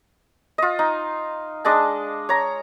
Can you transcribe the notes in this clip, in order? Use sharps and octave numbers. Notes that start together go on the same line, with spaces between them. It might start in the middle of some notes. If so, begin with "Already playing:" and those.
F4 D#5
D#4
G#3 D4 D#5 A5
C#5 A#5